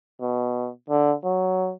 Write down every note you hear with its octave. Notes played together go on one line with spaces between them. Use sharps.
B2
D3
F#3